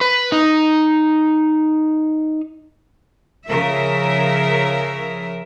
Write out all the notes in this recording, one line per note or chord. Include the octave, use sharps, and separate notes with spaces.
B4
D#4
C#3 F3 A#4 E5